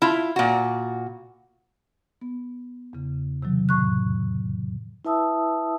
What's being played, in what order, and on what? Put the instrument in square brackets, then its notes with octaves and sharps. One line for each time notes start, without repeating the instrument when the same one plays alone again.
[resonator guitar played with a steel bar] E4 F4
A#2 F#4
[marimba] B3
E2 C#3
C3 D#3 F#3
F2 A2 C#6 F#6
[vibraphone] E4 B4 E5 A5 D#6 E6